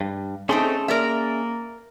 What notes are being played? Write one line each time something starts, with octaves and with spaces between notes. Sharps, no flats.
G2
A3 C4 C#4 D#4 G#4 A4 C6
A#3 A#4 D5 E5